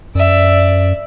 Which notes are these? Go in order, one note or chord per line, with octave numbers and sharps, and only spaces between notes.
F#2 D5 E5